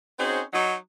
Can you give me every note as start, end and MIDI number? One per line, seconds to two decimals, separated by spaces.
0.18 0.40 60
0.18 0.40 61
0.18 0.40 63
0.18 0.40 66
0.18 0.40 68
0.18 0.40 72
0.53 0.74 54
0.53 0.74 63